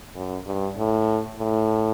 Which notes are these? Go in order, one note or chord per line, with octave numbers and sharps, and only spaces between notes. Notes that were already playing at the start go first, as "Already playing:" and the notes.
F#2
G2
A2
A2